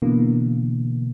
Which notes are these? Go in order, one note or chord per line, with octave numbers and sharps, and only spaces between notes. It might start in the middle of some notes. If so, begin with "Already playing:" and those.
B2 D3 E3 A#3